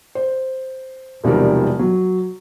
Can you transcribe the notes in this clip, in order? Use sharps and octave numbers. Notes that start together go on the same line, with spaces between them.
C5
E1 C3 D#3 F3 G3 A#4
F#3